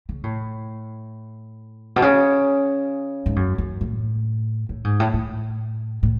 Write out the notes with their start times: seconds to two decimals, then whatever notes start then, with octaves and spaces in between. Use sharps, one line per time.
0.09 C#3
0.24 A2
1.96 B2
2.02 C#3
3.26 G#2
3.36 F#2
3.58 F#2
3.81 A2
4.69 A2
4.84 G#2
5.00 A2
5.14 A2
6.03 A2